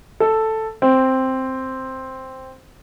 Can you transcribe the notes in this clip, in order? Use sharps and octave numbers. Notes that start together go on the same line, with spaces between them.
A4
C4